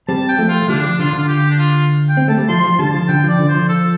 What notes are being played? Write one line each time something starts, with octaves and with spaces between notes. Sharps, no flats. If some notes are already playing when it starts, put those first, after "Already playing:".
G3 C4 A5
G5
F3 A3
F4
F3
D3 G3 D4
F3
D3 F4
D3
F4
G4
D4
F4
G5
C4
A3 A5
G3
F3 C6
F3
D3 G3 A5
F3
D3 G5
F3 D5
D3
C5
F3
A4